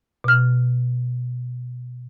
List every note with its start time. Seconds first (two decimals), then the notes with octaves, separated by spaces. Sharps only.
0.24 B2 F6